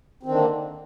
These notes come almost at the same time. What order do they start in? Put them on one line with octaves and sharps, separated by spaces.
C4 D#3 D4 D3 A#3